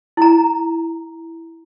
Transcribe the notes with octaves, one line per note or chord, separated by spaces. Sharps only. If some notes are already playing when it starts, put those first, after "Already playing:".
E4 A#5